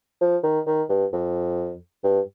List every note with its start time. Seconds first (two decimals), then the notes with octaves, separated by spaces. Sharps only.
0.21 F3
0.43 D#3
0.66 D#3
0.89 G2
1.12 F2
2.04 G2